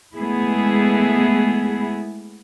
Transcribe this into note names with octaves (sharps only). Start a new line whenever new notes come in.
G#3 A3 B3 E4 G#4